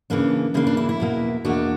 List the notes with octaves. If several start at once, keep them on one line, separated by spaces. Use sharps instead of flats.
C#3 E3 A#3 D4
C#3 E3 A#3 D4 E4
D4
E4
E4
E2 B2 A#3
E2 B2 A#3 D4 F#4